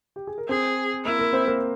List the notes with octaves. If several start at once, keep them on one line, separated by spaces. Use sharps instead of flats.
G4
G#4
A#4
C4 G#4 C5
A#3 E4 A#4
A#3 A#4
C4 C5
A#3 A#4